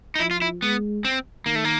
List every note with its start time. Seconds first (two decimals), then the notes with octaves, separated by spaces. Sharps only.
0.15 D#4
0.20 F3 E4
0.31 F4
0.42 E4
0.62 G#3 B3
1.05 C4
1.46 D#3 A#3
1.55 A3
1.65 A#3